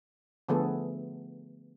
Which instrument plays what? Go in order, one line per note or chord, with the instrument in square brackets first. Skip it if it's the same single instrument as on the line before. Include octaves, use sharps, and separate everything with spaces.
[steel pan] D3 F3 A3 B3 G#4 A4